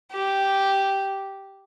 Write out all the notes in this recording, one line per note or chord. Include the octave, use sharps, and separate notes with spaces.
G4